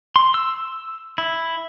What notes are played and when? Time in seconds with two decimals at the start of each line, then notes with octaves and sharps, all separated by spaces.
0.16 C6
0.34 E6
1.18 E4